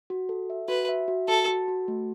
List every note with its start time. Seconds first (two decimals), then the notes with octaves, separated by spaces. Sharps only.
0.10 F#4
0.29 A4
0.50 E5
0.68 F#4 B4
0.89 E5
1.08 F#4
1.28 F#4 A4
1.48 F#4
1.68 F#4
1.88 A3